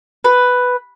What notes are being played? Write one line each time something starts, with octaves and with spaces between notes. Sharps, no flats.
B4